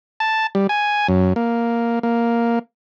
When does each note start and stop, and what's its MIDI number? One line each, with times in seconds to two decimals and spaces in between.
0.20 0.47 81
0.55 0.67 55
0.69 1.07 80
1.08 1.33 42
1.36 1.99 58
2.03 2.59 58